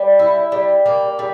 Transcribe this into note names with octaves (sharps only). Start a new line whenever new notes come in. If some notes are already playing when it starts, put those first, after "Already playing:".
Already playing: G3
E4
G3
A#3
G3